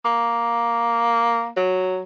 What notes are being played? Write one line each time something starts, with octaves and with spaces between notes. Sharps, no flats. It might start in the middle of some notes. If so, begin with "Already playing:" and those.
A#3
F#3